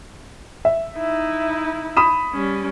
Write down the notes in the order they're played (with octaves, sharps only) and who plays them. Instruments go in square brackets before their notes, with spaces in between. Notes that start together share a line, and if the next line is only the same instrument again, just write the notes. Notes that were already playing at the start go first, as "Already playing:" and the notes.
[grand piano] E5
[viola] D#4 E4
[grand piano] B5 D#6 E7
[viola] G3 C#4